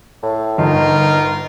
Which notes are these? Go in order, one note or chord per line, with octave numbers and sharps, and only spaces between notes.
A2
G1 D#4 F4 A#4